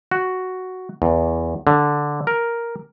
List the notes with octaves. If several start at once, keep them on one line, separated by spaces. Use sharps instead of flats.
F#4
E2
D3
A#4